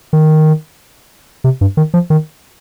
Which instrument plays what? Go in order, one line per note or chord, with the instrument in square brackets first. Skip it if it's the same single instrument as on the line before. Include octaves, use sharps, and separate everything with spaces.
[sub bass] D#3
C3
G2
D#3
F3
D#3